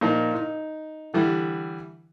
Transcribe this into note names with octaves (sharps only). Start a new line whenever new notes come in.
A#2 F3 D#4 A#4
D#4
D3 E3 G3